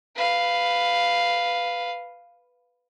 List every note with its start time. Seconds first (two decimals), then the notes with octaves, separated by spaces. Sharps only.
0.16 B4 F5